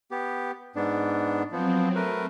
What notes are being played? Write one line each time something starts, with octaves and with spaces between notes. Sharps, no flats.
B3 G4
G#2 B3 D4
F3 F#3 B3 C4
A3 A#4 B4